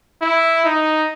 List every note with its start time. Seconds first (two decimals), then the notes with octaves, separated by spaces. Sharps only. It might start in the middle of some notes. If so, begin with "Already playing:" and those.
0.22 E4
0.65 D#4